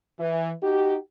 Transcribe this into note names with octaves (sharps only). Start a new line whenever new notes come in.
E3
D#4 F#4 G4